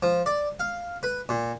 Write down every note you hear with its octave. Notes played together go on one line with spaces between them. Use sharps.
F3
D5
F5
B4
A#2